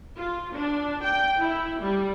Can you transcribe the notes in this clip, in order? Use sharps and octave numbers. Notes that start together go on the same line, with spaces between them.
F4
D4
G5
E4
G3